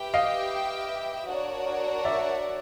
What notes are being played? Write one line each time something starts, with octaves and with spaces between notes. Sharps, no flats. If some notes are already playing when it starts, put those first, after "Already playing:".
Already playing: G4 B4 E5 G5
D#5 F5
D4 F#4 A#4 C#5 F#5
D5 E5